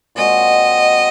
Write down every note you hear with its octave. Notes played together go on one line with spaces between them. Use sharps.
A#2 G#3 C4 F#4 D#5